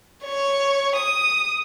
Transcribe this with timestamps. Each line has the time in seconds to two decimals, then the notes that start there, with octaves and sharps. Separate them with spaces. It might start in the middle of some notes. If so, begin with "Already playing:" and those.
0.24 C#5
0.96 D#6